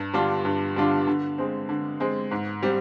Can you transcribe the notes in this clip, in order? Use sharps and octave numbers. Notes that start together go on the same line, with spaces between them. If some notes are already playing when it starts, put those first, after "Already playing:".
Already playing: G2
D3 G3 D4 F4
G2
D3 G3 D4 F4
D3
G#3 C4
D3
G#3 C4
G#2
G3 C4